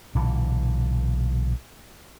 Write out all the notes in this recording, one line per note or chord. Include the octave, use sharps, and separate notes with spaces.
B1 A#2 D3 E3